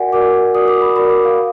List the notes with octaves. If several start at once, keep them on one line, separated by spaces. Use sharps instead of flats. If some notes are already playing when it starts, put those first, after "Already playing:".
Already playing: F#4 A#4 D5 F#5 G#5
F#4 A#4 D5 D6
F#4 A#4 D5 D#6
D6
B5
F#4 A#4 D5 B5
D6
F5